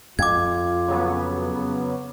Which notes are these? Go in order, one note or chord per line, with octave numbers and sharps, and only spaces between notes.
F2 F4 D6 G#6
C#3 F#3 B3